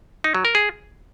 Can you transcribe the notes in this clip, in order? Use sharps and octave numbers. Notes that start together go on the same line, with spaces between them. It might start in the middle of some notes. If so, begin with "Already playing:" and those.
D#4
F#3
A#4
G#4